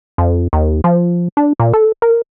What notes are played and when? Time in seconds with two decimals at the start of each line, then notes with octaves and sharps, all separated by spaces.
0.18 F2
0.53 D#2
0.84 F3
1.37 D4
1.60 A#2
1.73 A4
2.02 A#4